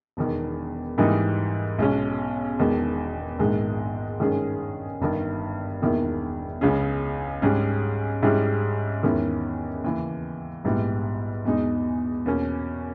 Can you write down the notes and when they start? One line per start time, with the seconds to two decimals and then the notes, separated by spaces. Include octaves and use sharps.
0.17 E1 E2 D#3
0.98 G#2 E3 G3 A#3 D#4
1.78 B1 B2 G#3 C#4
2.59 E1 E2 D#3 G#3
3.38 A#1 G#2 D#3 G#3
4.19 G2 D#3 G#3 C#4 G#4
5.01 G1 G2 D#3
5.81 E1 E2 D#3 A#3 E4
6.61 C#2 C#3 G#3 C#4 G#4
7.42 G#2 G3 C#4 G#4
8.22 G#2 G3 C#4 E4 G#4
9.03 E2 D#3 G#3 C#4 E4
9.84 D#2 C#3 E3
10.64 A#1 G#2 G3 B3 E4
11.45 E2 B2 G#3 D#4
12.26 E2 B2 A#3 C#4